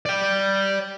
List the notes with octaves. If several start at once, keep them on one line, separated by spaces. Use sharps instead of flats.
D5 G5